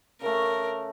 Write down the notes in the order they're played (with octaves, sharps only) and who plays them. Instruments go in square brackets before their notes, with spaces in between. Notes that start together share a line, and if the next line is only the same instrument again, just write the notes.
[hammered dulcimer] C#3 A3 [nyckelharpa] A#4